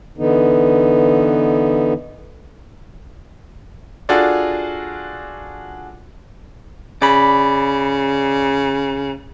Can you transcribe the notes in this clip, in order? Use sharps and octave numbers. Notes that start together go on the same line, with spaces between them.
D3 E3 B3 D#4
D4 F4 F#4 G#4 A4 D5
C#3 D5 B5